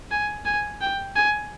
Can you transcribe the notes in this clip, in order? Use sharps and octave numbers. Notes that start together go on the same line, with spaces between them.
G#5
G#5
G5
G#5